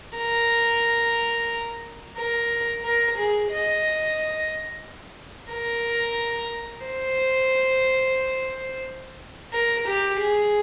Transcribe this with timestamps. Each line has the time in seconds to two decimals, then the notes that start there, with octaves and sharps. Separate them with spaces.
0.18 A#4
2.18 A#4
2.85 A#4
3.18 G#4
3.52 D#5
5.52 A#4
6.86 C5
9.54 A#4
9.88 G4
10.21 G#4